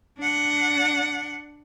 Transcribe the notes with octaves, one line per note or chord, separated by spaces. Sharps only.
D4 F#5